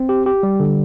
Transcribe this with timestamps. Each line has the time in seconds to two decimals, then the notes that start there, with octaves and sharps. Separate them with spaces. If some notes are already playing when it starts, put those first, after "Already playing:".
Already playing: C4
0.09 G4
0.26 G4
0.43 G3
0.60 D3